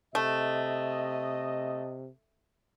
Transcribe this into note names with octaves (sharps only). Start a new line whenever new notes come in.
C3 A3 D#5